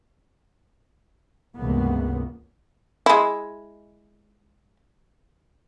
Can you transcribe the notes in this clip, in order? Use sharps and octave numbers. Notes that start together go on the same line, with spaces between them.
C#2 G2 C3 E3 A#3 B3
G#3 E4